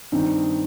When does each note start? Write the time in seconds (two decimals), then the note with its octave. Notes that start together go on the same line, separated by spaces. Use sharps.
0.12 G2 D#3 C4 D#4